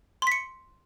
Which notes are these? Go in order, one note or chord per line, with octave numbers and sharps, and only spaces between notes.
C6 B6 C#7